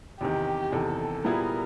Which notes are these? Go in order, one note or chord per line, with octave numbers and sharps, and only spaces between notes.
E2 C3 D#3 G4
E2 C3 D#3 A4
A#2 G3 B3 E4 G#4 A#4